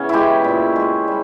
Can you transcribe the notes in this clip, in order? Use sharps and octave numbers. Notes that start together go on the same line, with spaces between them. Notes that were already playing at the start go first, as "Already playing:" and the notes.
Already playing: C#3 E3 B3 C#4
G#3 E4 G4
A#2
G#3
G3